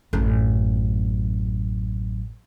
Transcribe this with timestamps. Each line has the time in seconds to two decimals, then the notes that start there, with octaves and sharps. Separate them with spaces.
0.13 A1 F#2